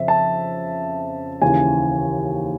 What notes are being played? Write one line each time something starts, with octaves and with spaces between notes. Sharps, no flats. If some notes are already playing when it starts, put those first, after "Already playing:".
Already playing: F2 C#3 E5
A5
D#2 C#3 E3 G#5